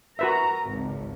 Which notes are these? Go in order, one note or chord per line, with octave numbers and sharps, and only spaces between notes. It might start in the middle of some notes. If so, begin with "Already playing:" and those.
F#4 A#4 B4 E5 A#5
G#1 C#2